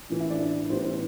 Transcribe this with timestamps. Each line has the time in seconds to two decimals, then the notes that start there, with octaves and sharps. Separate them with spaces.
0.10 A1 A2 E3
0.20 E4 E5
0.30 D4 D5
0.69 A1 A2 G3 B3 C5
0.84 C5